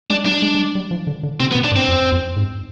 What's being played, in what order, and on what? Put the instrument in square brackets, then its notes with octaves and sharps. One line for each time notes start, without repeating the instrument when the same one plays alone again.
[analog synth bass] G#3 [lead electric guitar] D4
[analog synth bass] G3 [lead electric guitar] D4
[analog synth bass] G#3
G#3
G3
G3
F3
D3
D3
[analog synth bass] C3 [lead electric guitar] C4
[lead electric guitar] B3
[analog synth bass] B2
[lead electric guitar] D4
[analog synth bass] G#2
[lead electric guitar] C4
[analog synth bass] F2
F2
G#2